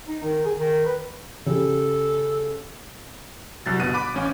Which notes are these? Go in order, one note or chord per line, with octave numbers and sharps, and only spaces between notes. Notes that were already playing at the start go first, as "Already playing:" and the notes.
D#4
D#3
G#4
D#3
B4
C#3 G4 A4
C2 F#3 A6
G1 B2 F#6 D#7
B5 D6
A1 C#4 F5